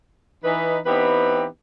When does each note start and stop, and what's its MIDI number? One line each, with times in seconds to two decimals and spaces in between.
0.44 0.79 52
0.44 0.79 63
0.44 0.79 71
0.86 1.46 52
0.86 1.46 59
0.86 1.46 60
0.86 1.46 63
0.86 1.46 67
0.86 1.46 71